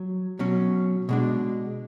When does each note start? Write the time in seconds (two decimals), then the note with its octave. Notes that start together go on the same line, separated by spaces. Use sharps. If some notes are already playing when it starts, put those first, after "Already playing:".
Already playing: F#3
0.39 B2 F#3 C#4
1.09 B2 G#3 D4